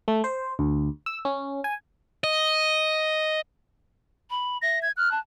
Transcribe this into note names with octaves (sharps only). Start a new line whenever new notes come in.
A3
C5
D2
E6
C#4
G#5
D#5
B5
E5 A#6
G#6
F6 F#6
A5